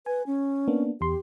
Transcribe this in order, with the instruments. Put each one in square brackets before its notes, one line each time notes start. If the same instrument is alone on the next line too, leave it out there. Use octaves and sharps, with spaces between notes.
[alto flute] B4 [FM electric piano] G#5
[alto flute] C#4
[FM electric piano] A#3 B3 D4
[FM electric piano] E2 C6 [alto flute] G4